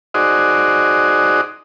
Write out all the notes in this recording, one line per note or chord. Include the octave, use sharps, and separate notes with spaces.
D#4 F#4 G#4 C5 D5 D#5